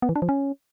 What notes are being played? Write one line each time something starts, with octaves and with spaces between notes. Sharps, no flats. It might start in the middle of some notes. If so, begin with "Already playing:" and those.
B3
E3
D4
F3
C#4